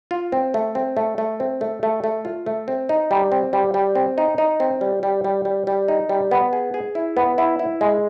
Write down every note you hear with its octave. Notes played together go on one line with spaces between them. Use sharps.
F4
C4
A3
C4
A3
A3
C4
A3
A3
A3
F4
A3
C4
D#4
G3
C4
G3
G3
C4
D#4
D#4
C4
G3
G3
G3
G3
G3
D#4
G3
B3
G#4
G#4
E4
B3
E4
E4
G#3